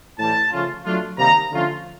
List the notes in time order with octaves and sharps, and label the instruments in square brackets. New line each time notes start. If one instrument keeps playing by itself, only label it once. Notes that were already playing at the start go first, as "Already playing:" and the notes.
[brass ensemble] A2 E3 G3 A5
C#3 F3 A3 C#4 F4
F#3 A3 D4 F4
C3 D#3 G3 A#3 D#4 A#5
D3 F3 A3 C#4 F4